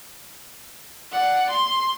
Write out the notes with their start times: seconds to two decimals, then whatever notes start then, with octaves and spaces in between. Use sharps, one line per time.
1.12 D5 F#5
1.50 C6